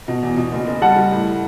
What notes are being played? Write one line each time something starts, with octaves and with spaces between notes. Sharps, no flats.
B2
E2
B2
F#1
F#1
G3 F#5 A5
G3
A2